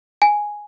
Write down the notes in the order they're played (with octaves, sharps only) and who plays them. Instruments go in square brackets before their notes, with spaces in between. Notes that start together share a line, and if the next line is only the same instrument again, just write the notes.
[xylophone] G#5